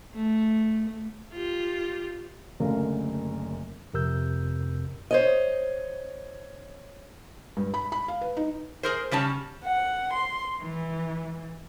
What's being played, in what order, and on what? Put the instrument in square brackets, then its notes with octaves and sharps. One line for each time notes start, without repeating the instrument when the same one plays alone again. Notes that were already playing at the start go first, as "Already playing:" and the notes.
[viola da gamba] A3
[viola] F4 G4
[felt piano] F#1 F#2 D3 A3 A#4 F5
[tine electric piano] F2 C3 A#4 E6 G6
[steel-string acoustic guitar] C5 C#5 D#5
[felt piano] G2
B5
B5
F5
B4
D#4
[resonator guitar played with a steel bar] G#4 A#4 C5
C#3 G3 C#4 A5
[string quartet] F#5
C6
E3